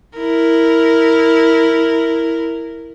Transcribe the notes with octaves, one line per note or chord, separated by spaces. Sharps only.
E4 A#4